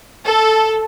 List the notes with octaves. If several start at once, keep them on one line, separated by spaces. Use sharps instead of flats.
A4